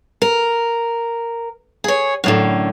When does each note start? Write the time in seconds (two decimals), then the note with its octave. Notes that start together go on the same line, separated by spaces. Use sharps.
0.22 A#4
1.84 G#4 C#5
2.24 F#2 A2 D3